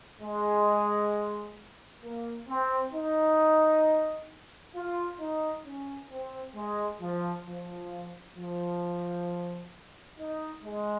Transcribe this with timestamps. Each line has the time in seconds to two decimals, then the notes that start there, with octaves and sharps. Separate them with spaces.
0.21 G#3
2.03 A#3
2.48 C4
2.93 D#4
4.75 F4
5.20 D#4
5.65 C#4
6.10 C4
6.55 G#3
7.01 F3
7.46 F3
8.37 F3
10.18 D#4
10.63 G#3